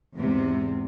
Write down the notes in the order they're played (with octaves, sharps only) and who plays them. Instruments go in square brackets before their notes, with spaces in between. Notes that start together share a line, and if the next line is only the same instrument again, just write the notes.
[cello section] E2 G#2 C3